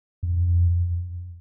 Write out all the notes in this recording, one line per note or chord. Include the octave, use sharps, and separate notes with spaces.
F2